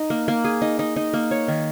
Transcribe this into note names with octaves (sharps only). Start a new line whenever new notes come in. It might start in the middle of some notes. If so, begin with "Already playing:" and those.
Already playing: D#4
A#3
A#3
G#4
D#4
D#4
D#4
A#3
C#5
D#3